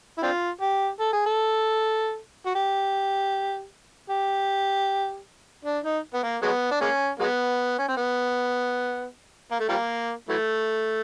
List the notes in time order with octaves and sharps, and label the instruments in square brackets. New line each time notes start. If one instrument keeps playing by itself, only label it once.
[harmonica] E4
C4 D4 F4
G4
A4
G#4
A4
F#4
G4
G4
D4
D#4
B3
A#3
F#3 G#3 B3
D4
G#3 A#3 C#4
F#3 G#3 B3
C#4
C4
B3
A#3
A3
F3 G3 A#3
E3 F#3 A3